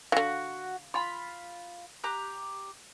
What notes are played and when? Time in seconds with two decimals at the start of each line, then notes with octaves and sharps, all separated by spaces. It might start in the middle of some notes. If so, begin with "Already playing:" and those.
0.12 D3 E3 F#4 F5
0.94 F4 B5 C6
2.04 G4 A#5 F#6